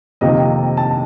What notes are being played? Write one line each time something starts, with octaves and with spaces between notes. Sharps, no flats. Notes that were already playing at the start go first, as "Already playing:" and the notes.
F2 C3 D#3 A#3 D#5
A5